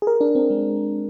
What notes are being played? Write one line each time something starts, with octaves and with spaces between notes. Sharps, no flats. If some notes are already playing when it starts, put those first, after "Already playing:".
G#4
A#4
D4
C4
G#3